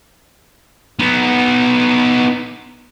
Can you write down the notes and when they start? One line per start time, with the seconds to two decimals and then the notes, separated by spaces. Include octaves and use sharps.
0.99 B3 D#4